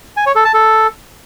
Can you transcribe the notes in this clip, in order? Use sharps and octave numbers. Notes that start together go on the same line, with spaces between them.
G#5
C#5
A4
A5
A4